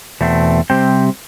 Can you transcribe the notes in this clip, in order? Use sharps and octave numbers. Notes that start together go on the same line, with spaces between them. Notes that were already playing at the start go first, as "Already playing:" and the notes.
E2 B2 A3 C4
C3 G3 C4 G5